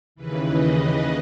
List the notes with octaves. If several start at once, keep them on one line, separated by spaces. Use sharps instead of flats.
D#2 C#3 E3 B4
D#5
D#5